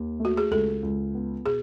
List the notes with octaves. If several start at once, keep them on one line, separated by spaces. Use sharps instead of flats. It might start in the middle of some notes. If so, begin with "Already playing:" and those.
Already playing: D#2
A3
F#4
G#4
C#2 A4
C#2
B3
B2 G#4